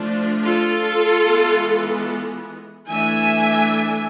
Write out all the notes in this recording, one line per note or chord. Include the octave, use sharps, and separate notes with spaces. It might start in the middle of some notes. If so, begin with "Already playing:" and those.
Already playing: F3 A3 D4
F4 A4
E3 G#3 B3
E3 A3 D4 E5 G#5